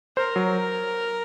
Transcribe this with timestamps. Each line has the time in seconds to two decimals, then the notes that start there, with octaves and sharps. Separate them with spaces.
0.17 A#4 C5
0.36 F#3